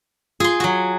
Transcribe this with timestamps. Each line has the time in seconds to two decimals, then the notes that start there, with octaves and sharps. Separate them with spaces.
0.40 F4 G#4 C6
0.60 F#3 F#4